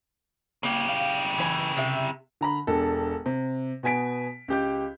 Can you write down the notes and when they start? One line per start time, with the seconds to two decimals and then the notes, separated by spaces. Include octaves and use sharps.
0.63 C#3 A#3 G4 G5
0.89 F5
1.38 E3 C5 G#5
1.76 C3 E5
2.41 D3 A#5 B5
2.67 E1 D4 A4
3.26 C3
3.83 B2 B3 G#5 B6 D7
4.48 C#2 G4 G6